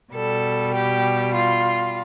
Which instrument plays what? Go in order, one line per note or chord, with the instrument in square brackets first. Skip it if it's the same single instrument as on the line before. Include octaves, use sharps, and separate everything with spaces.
[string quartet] B2 G3 A4
G4
F4